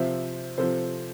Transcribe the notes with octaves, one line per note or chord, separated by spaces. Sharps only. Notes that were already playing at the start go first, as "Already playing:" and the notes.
Already playing: C3 F3 C5 E5
C3 F3 A4 C5